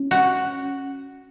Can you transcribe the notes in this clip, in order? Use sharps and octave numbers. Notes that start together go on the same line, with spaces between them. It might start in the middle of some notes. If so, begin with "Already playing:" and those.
Already playing: C#4
F#4